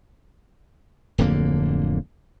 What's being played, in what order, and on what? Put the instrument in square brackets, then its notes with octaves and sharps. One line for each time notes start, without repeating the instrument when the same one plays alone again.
[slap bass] D1 F2 D3 A#3